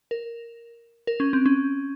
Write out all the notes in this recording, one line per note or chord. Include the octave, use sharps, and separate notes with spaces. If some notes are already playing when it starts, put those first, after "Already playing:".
A#4
A#4
C#4
C4
C#4